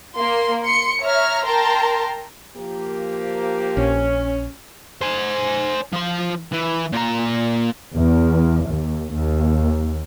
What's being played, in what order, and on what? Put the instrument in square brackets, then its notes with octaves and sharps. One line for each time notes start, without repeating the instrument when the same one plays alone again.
[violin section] A#3 C6
C6 C#7
C#5 E5 A#5 F6
A#4 G5 A5 A#5 C6
[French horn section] F3 A#3 G4
[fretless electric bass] A#1 [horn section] C#4
[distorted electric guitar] C5 G#5
F3 C6
E3
A#2 A#5
[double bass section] E2
D#2
D#2